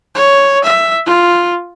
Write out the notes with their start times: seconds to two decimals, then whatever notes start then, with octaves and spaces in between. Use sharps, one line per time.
0.15 C#5
0.64 E5
1.06 F4